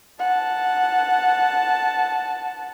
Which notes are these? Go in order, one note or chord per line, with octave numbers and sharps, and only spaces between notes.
F#5 A5